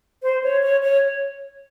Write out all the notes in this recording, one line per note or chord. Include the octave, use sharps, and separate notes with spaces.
C5
C#5
C#5
C#5